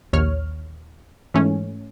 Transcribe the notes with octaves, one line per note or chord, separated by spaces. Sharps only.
A#1 D#2 C#5 F6
G#2 E3 A3 C#4